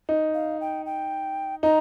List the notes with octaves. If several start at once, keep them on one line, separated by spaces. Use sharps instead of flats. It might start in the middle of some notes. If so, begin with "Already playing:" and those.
D#4
F5
G5
G5
D#4 A#5